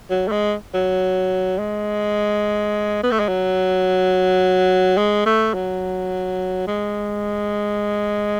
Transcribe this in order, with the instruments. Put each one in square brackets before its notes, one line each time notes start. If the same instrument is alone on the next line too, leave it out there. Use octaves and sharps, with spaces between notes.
[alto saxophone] F#3
A3
G#3
F#3
G#3
B3
A3
G#3
F#3
G#3
A3
F#3
G#3